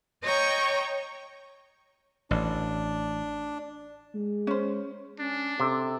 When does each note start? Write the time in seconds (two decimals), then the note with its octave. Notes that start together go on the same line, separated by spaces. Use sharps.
0.23 C#5 D#5 G5 A#5 C#6
2.31 A1 D4
4.15 G#3
4.47 C#4 C5
5.19 C#4 D4
5.60 C3 A4